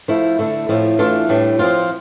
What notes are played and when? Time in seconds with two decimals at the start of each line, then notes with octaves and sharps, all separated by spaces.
0.08 F3 A3 E4
0.39 D3 A3 E4
0.69 A2 F3 C4 E4
0.99 E3 A3 D4 F4
1.29 A2 G3 D4
1.59 F3 C4 F4